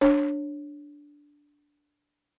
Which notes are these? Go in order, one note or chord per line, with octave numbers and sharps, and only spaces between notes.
D4 C#5